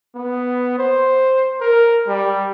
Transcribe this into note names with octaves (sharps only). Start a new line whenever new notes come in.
B3
C5
A#4
G3